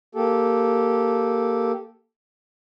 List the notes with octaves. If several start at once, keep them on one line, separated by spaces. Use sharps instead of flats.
A#3 G4 A4